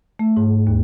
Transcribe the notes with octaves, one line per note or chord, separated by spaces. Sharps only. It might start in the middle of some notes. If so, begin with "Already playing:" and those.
A3
G#2
D#2